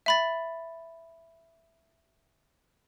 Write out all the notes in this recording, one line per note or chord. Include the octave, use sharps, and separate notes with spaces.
E5 B5 A6